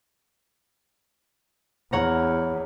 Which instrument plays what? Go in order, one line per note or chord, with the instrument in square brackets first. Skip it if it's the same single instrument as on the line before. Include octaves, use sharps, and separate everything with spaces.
[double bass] E2 [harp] C#5 F#5 A#5